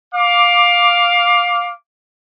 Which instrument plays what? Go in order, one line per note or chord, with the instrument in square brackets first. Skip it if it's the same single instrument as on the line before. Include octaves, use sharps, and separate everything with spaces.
[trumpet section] F5 D6